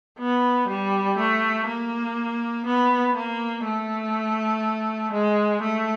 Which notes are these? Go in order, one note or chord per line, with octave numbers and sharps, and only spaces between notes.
B3
G3
A3
A#3
B3
A#3
A3
G#3
A3